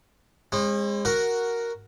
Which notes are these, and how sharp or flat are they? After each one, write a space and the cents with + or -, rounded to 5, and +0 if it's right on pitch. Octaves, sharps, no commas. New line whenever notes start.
G#3 -25 C4 +40
F#4 +0 A#4 +0